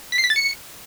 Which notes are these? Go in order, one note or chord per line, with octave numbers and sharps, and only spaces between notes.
B6
C7
B6
A6
C#7